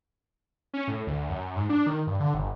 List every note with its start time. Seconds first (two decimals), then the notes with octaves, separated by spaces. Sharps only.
0.73 C#4
0.88 A2
1.07 D2
1.30 F#2
1.56 G#2
1.69 D4
1.87 D#3
2.07 G2
2.20 D3
2.34 G1